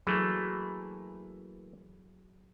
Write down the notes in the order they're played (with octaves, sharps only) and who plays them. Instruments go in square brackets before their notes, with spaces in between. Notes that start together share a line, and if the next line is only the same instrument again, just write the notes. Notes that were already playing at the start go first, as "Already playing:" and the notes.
[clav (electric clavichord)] E3 A3 A#3 [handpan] F#3 G#4